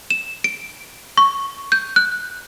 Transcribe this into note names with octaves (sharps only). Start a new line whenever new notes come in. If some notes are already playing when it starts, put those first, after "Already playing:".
E7
D7
C#6
G6
F#6